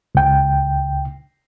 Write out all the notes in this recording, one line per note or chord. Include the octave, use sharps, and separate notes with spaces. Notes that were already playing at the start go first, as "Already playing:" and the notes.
C#2 G5